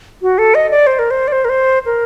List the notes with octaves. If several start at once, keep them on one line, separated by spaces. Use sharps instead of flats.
F#4
A4
D#5
D5
C5
A#4
C5
D5
C5
A#4
C5
A#4